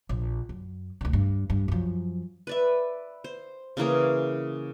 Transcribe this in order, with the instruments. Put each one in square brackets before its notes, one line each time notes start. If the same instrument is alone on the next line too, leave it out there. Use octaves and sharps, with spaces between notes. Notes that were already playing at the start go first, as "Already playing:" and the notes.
[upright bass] A#1
F#2
D2 D3
G2
G2
F#2 F3
[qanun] B4 D5 E5
C5
C#3 E3 A#3 G#4